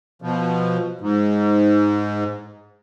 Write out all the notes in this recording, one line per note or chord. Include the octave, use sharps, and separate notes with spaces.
B2 F3
G#2